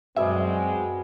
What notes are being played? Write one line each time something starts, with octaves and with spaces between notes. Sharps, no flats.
F#2 B2 G3 G#3 C4 G#4 E5